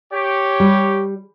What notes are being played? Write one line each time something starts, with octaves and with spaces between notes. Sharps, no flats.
G4 C#5
G3